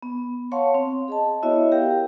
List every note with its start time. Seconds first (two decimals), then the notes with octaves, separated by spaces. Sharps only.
0.03 B3
0.52 C#5 F5 F#5 A5 C6 C#6
0.74 C4
1.08 G#4 D#5 A5
1.43 B3 E4 F#4 C#5 D#5 E5
1.72 G4 A#4 F5 G5